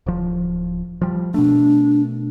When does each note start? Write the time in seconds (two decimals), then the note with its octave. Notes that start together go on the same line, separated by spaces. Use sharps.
0.06 D1 F3
1.01 F3 G3
1.34 B2 A3 D4